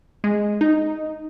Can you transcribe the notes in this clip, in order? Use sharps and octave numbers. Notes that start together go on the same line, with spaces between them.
G#3
D#4